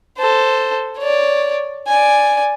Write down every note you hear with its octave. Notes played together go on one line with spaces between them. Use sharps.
A4 C5
C#5 D5
D5 G#5